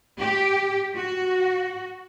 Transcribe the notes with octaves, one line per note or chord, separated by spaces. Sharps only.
G4
F#4